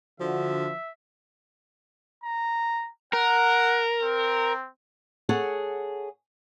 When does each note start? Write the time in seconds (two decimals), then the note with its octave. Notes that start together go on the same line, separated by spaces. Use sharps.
0.20 D3 F3 F#4 E5
2.24 A#5
3.13 A#4 F#5
4.02 C4
5.29 G#4 A4 C#5 F#5